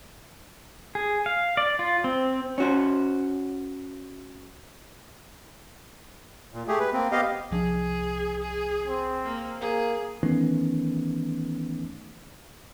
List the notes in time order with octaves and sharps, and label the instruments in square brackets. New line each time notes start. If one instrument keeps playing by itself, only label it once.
[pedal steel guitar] G#4
F5
D5
F4
C4
[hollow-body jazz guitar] C#4 F#4 C5
[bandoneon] A#2
A3 G4 G#4
B4
A#3 C4
B3 G4 D#5 F5
[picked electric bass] C2 F3 D4 [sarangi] G#4
[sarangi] G#4
[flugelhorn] C4
[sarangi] A#3
[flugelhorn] A#3 [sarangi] G#4
[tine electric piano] D#3 E3 A3 B3 C#4 D#4